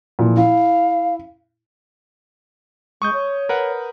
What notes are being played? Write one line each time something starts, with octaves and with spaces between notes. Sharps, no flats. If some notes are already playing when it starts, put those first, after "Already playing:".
A#2 E3 F3
E4 F5
G#3 C#6 D#6 G6
C#5
A#4 B4 F#5